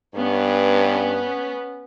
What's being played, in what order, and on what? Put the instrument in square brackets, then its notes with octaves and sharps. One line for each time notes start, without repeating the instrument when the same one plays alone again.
[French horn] G2 [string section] B3 C#4